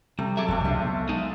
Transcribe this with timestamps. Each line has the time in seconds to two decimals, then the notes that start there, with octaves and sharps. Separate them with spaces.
0.19 C3 G3 A3 A#5
0.37 F#3 G#4 A4 E5 D6
0.48 F1 E2 C3 G#3 A3
0.64 C2 B2 D4 F4 E5 F#5
0.82 B3
1.09 G#3 D#4